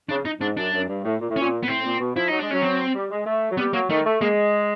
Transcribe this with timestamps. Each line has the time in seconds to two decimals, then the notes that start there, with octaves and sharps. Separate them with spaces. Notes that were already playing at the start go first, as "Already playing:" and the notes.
0.09 C#3 D4
0.25 D#4
0.41 G#2 D4
0.57 F#2 D4
0.73 F#2
0.89 G2
1.05 A2
1.20 A#2
1.30 A2
1.36 A#2 C#4
1.63 B3
1.68 A2 C4
1.84 A#2
1.99 B2
2.16 F3 E4
2.28 F#3 D#4
2.39 G#3 D4
2.51 F#3 C#4
2.63 C4
2.94 G3
3.11 G#3
3.26 A3
3.51 F#3
3.57 G3 B3
3.73 F#3 A#3
3.90 D#3 A3
4.06 A3
4.21 G#3 A#3